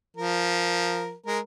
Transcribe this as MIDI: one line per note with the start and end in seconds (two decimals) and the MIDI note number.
0.16 1.14 53
0.16 1.14 70
1.26 1.39 56
1.26 1.39 70